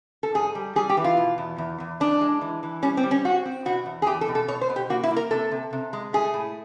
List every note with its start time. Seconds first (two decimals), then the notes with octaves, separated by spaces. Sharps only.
0.23 A4
0.34 G#2 G#4
0.55 G3
0.76 G3 G#4
0.90 G4
0.97 E3
1.04 F4
1.17 B2
1.38 E2
1.58 E2
1.80 E2
2.00 G#3 D4
2.21 G#3
2.41 E3
2.63 E3
2.82 G3 C#4
2.97 C4
3.03 G3
3.11 C#4
3.25 C4 F#4
3.46 C4
3.65 B2 F#4
3.86 E2
4.02 G#4
4.06 E2 G4
4.21 A4
4.28 B2
4.35 A4
4.48 B2 C#5
4.61 C5
4.69 B2
4.76 G4
4.90 A#3 F#4
5.03 E4
5.11 A#3
5.17 A#4
5.31 C3 A4
5.52 C3
5.73 C3
5.93 G#3
6.13 A3 G#4
6.34 A2